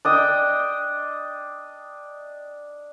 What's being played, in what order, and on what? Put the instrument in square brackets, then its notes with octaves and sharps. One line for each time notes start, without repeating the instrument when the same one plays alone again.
[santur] D4 D#5 G5